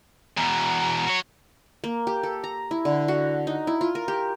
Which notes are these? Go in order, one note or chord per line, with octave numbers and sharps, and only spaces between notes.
E2 B2 A#5
F#4 C#5
A#3
G4
A4
A#5
E4
D3
F#4
D#4
E4
F4
A#4
G4